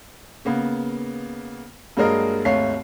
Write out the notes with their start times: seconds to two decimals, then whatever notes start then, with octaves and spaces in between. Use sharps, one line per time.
0.45 C#3 A#3 B3
1.97 G2 F#3 G#3 A#3 A#4 D#5
2.45 G#1 D#2 A3 C#5 F5 C7